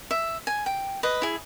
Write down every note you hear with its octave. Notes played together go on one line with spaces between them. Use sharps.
E5
G#5
G5
B4 D#5
E4 G#4